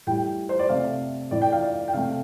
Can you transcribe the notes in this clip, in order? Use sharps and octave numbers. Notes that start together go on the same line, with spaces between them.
A2 G3 G5
C5
D5
C3 A3 F5
A2 A3 D5
G5
F5
D5
G5
C3 A3 F5